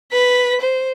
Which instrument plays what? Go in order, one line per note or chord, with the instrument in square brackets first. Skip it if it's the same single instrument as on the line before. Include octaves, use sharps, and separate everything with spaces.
[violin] B4 B6
C5